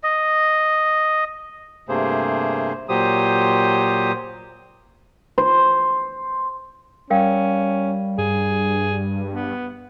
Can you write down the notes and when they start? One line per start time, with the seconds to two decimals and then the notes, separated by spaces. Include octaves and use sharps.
0.03 D#5
1.89 G2 C3 A3 A#3 G#4 C5
2.89 A#2 F#3 G4 C5 D#6
5.38 C5
7.10 G3 C#4 A#4 F5 G5
8.18 G2 G#4
9.34 B3